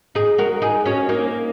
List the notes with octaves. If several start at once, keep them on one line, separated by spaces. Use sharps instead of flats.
D#4 G#4
F#4 A#4
D#4 G#4
C#4 F#4
A#3 D#4